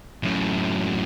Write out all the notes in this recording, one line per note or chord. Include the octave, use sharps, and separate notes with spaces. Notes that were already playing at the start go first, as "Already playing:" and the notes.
F#2 A2